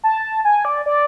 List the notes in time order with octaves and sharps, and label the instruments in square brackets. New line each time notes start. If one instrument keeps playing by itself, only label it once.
[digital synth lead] A5
G#5
D5
D5